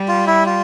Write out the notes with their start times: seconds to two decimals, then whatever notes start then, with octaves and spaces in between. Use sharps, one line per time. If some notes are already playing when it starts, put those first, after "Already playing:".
Already playing: G3
0.08 F4
0.27 E4
0.46 F4